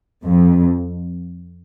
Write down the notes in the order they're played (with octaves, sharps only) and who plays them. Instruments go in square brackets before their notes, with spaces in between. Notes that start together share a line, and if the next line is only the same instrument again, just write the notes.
[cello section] F2